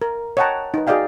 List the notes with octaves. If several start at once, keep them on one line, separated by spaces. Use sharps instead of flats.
A#4
C#5 D#5 F#5 G5 A5 A#5
D#4 B4
F#4 G#4 D5 D#5 F5 G5